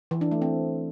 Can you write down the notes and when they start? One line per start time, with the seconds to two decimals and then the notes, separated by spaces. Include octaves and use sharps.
0.11 E3
0.21 D4
0.31 A3
0.42 C4